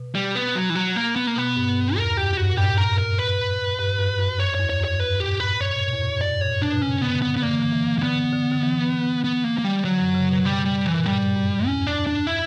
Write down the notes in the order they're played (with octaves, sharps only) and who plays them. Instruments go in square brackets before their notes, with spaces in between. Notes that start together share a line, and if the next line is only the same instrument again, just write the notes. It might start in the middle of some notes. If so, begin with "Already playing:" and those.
Already playing: [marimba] B2
[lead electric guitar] G3
B3
F#3
E3
F#3
A#3
B3
A#3
[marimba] B2 [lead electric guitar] B3
[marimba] G2
[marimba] E2 [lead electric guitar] A#4
[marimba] F#2 [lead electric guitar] G4
[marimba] F#2
[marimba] G2 [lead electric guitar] F#4
[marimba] A#2
[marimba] G2 [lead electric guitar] G4
[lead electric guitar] A#4
A#4
B4
[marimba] G2
F#2
F#2
[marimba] F#2 [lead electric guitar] C#5
[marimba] E2 [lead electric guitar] C#5
[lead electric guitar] C#5
[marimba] F#2
[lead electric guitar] C#5
[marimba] G2 [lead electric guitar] B4
[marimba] A#2 [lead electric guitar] G4
[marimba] G2 [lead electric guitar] B4
[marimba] G2 [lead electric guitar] C#5
[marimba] B2
A#2
E2
F#2
G2
[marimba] F#2 [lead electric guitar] D5
[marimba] G2
[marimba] A#2 [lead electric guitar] C#5
[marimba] B2 [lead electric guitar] D4
[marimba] B2
[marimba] C#3 [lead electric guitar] C#4
[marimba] D3 [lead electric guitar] B3
[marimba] D3 [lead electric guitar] B3
[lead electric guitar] B3
[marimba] D3 [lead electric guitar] A#3
[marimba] E3
D3
E3
[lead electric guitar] A#3
[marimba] D3 [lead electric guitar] B3
[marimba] D3
D3
E3
[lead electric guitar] B3
A#3
A#3
G3
[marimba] D3 [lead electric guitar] F#3
[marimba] F#2
C#3
B2
[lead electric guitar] G3
G3
E3
[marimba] A#2
[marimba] G2 [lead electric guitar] G3
[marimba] F#2
[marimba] E2 [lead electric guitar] C#4
[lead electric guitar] D4
D4
E4